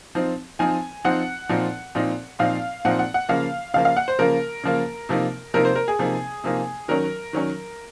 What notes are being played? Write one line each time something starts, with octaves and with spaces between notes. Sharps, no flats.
F3 C4 D#4
F3 C4 D#4 G#5
F3 C4 D#4 F#5
A#2 F3 C4 D#4
A#2 F3 C4 D#4
A#2 F3 C4 D#4 F5
A#2 F3 C4 D#4 F#5
F#5
F#5
C#3 F3 A#3 F5
C#3 F3 A#3 F5
F5
F#5
C5
C#3 F3 A#3 A#4
C#3 F3 A#3
C3 F3 A#3 D#4
C3 F3 A#3 D#4 A#4
C5
A#4
G#4
C3 F3 A#3 D#4
C3 F3 A#3 D#4
D#3 F#3 C#4 A#4
D#3 F#3 C#4